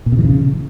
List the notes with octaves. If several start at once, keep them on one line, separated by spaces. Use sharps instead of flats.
A#2
C3
E3
C#3